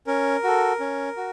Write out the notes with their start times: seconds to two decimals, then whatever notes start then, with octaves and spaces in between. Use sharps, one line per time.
0.07 C#4 A#4
0.44 F#4 A4
0.80 C#4
1.17 F#4